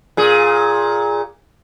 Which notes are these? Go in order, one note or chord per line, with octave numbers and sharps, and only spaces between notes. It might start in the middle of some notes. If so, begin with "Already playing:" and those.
A#2 G#4